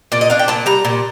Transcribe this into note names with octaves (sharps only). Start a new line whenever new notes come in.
A#2 D5
D#5
D4 F5
G5
A#2 A5
G3 A#5
A#2